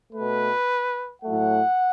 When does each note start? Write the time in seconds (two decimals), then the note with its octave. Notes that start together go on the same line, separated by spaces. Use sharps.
0.13 B2 A3 B4
1.23 A2 F#3 A3 F#5